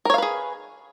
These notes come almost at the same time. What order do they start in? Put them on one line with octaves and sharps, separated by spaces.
A#4 C#5 F5 B4 G#4